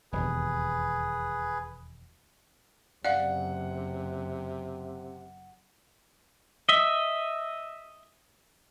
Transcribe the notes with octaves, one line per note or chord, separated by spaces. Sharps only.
E1 D#2 G#4 B4
F#1 C3 D5 F5 F#5
D#5 E5